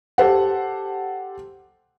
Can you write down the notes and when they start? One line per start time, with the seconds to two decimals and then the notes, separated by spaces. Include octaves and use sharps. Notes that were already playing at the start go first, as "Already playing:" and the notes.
0.18 G4 A4 C5 F#5